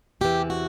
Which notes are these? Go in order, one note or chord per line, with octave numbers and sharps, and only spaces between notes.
E2 C3 E3 G4
F#4